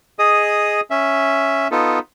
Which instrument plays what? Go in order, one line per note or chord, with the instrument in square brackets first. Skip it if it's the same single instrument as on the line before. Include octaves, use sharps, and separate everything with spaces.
[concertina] G#4 D#5 D#6
C#4 E5
B3 D#4 F4 A4